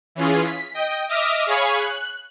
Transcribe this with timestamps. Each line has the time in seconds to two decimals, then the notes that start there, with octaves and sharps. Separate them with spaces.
0.15 E3 C#4 F4 G#4
0.45 B6
0.74 D#5 G5
1.09 D#5 E5 D6 D#6 F6 A#6
1.46 G#4 C#5 F5 G#5 B5 C#6
1.79 F#6